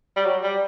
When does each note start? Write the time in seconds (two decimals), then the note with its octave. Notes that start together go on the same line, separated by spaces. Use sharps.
0.16 G3
0.25 F#3
0.43 G3